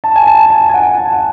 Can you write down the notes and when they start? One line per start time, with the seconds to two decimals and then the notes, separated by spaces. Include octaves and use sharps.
0.04 A5
0.16 G#5
0.27 A5
0.50 A5
0.69 G#5
0.74 F#5
0.97 A5